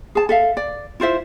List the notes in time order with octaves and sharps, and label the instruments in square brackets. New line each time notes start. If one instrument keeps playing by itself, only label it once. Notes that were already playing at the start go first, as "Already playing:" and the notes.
[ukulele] G#4 A5
A4 E5 F5
D5
E4 F4 C5 E5